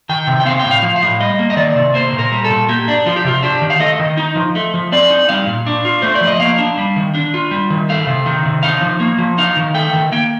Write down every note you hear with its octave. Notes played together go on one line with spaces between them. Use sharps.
D#3 G5
C3
G5
C4 F5
G5
A2
F5
F3
F5
A2
G3 D#5
A#3
D#5
D#3 D5
C3
A#3 C5
A#2
A#4
G3
A4
A#2
A#3 G4
D4
F3 F4
G4
C3 F4
D4 G4
D#3
F5
A3 D#5
D#3
D#4
F3
A3
F3
C4 D5
D#4
G3 F5
A#2
D4
F4
A3 C5
D5
F3
D#5
A#3 F5
D4
G3
D#3
D4
F4
G3
D#3
A3 F5
C3
D#3
C3
D#4 F5
F3
A#3
F3
D#4 F5
D#3
A3 G5
D#3
A#3 G5